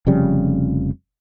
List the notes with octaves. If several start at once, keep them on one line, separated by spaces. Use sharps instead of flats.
F1 F2 C#3 G3